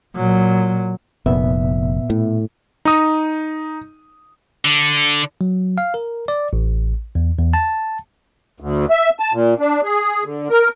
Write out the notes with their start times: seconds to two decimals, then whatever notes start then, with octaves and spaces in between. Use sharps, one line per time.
0.16 A#2 F#3
1.26 F1 A#2 B3 E5
2.10 A2
2.85 D#4 D#6
4.65 D3
5.41 F#3
5.78 F5
5.94 A#4
6.28 D5
6.53 A1
7.15 E2
7.38 E2
7.54 A5
8.60 D2
8.90 E5
9.19 A5
9.33 A#2
9.60 D4
9.84 G#4
10.24 D3
10.50 A#4